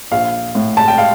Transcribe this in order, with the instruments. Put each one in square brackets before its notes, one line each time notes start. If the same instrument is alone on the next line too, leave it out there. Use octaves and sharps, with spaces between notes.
[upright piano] A#1 F5
A2
A5
G5
F5